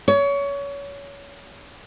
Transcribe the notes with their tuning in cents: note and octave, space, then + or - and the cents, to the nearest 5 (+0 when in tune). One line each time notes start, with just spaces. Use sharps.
C#5 +25